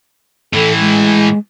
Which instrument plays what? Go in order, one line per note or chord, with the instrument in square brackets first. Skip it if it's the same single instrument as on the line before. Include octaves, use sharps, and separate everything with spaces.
[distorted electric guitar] A2 E3 [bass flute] A4
[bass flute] G#3